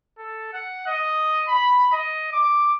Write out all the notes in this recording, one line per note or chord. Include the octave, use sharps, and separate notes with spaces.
A4
F#5
D#5
B5
D#5
D6